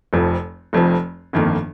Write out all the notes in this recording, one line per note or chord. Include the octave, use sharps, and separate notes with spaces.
F1 F2 F3
F1 F2 F3
G1 F2 D#3 A#3